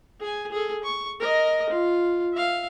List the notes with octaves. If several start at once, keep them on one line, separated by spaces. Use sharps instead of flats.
G#4 G#5
G#4 A4
C#6
A#4 D#5
F4
E5 F5